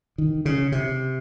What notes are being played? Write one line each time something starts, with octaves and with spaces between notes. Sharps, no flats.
D#3
C#3
C3